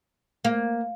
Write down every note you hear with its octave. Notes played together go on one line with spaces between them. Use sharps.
A#3